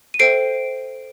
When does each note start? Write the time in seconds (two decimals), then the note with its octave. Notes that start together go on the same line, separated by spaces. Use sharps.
0.14 D#7
0.19 A4 C5 E5 G5 C7 D7